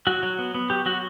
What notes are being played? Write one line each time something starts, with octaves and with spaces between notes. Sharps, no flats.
F#3 F#4
F#3
B3
B3
F#3 G4
F#3 F#4